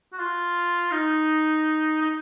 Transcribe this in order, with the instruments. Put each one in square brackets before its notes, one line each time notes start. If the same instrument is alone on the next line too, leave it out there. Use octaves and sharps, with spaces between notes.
[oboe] F#4
F4
D#4
D#4